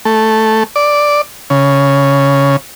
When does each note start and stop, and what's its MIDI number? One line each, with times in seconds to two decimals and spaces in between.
0.05 0.63 57
0.76 1.21 74
1.50 2.56 49